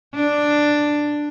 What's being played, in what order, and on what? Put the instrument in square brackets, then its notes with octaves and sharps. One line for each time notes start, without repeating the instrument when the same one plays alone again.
[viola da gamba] D4